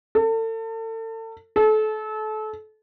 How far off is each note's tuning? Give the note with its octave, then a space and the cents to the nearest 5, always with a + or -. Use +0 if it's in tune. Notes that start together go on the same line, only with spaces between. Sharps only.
A4 +35
A4 -30